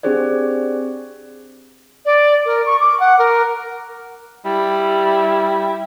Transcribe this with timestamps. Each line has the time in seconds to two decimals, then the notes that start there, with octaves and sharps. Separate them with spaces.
0.03 C4 D4 G4 G#4 C5 D5
2.05 D5
2.45 A#4
2.66 C#6
2.80 D6
3.00 F#5
3.18 A#4
4.45 G3 E4